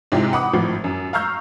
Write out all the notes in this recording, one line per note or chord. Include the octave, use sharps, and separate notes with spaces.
G#2 C3 G#3 C4 E4 F4
F#5 B5 D6 D#6
G#1 A2 F3
F#2
F5 A#5 C#6 E6 F6 G6